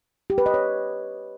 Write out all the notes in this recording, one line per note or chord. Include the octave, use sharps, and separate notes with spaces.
G4
B4
D#5
C#5